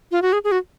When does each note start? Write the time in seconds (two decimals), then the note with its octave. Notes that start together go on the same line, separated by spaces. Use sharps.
0.12 F4
0.22 F#4
0.33 G#4
0.44 G#4
0.52 F#4